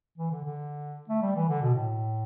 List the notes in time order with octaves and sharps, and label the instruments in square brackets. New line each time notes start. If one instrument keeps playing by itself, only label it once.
[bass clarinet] E3
D3
D3
A3
G3
E3
D3
B2
A2